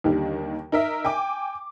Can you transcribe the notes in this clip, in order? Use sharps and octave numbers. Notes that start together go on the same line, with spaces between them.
D#2 D3 D#3 G3
D#4 A#4 E5
G5 G#5 D6